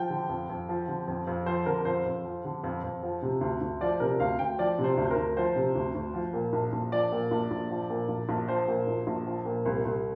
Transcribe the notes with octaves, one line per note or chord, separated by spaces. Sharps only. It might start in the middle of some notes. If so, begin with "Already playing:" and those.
Already playing: F3 G5
D3
F2
F2
F3
D3
F2
F2
F3 C5
D3 A#4
F2 C5
F2
F3
D3
F2
F2
F3
C3
D2
D2
F3 D5
C3 A#4
D2 F5
D2 G5
F3 D5
C3
C5
D2
C5
A#4
D2
F3 C5
C3
D2
D2
F3
A#2
A#1
A#1
F3 D5
A#2
A#1
A#1
F3
A#2
A#1
A#1
F3 C5
A#2
A#1
A#1
F3
A#2
C2
C2